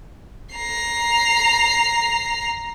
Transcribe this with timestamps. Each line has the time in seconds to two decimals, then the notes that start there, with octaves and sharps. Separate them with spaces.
0.55 A#5 C7